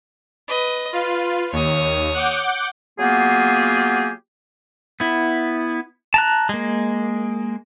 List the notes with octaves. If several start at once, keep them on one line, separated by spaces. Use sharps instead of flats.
B4 D#5
F4 B4
D#2 C#5 D#6
F#5 D6 G6
F#3 A#3 B3 F4 G4 G#4
B3 E4
A5 A#5 F#6
G#3 A#3